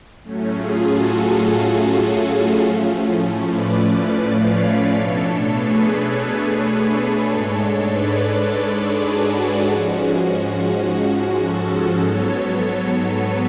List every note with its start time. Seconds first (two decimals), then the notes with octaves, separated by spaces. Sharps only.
0.24 A2 F#3 A3 C#4
0.53 F4 G#4
0.83 F#4 A4
1.42 F#4
2.59 A2 F3 A3 C#4
3.47 B4 D5
4.36 C#5 F5
4.94 B2 A3 D4 A4 C#5
5.53 G#4 B4
7.29 G#2 G#3 D4 A4 C#5
7.89 B4 D5
8.17 A4 C#5
8.47 A4 C#5
8.76 G#4 B4
9.06 F#4 A4
9.65 G#2 F3 G#3 C#4 F#4
10.82 F#4
11.41 F#4 A4
12.00 G#2 F#3 B3 A4 C#5
13.18 B4